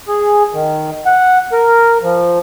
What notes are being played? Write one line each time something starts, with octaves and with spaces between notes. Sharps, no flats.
G#4
D#3
F#5
A#4
F3